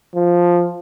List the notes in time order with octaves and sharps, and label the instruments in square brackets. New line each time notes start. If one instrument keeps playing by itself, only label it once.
[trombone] F3